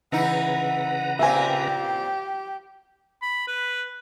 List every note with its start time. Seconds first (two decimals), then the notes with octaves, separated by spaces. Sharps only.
0.12 C#3 E3 D#4 E4 B4 F#5 A#5
1.19 A#2 A#3 C4 G4 E5 G#5
3.22 B5
3.47 B4